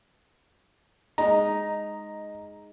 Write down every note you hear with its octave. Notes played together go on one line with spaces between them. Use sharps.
G#3 D#4 A#5